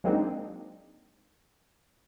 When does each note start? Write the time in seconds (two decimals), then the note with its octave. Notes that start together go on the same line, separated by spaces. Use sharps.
0.04 F#3 G#3 A#3 C4 D4 D#4